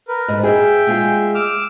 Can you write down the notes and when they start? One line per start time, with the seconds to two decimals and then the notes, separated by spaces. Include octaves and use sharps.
0.08 A#4 B4
0.28 G#2
0.43 G#4 E5 G5
0.87 G#3 F4 G#4
1.35 D6 E6 F6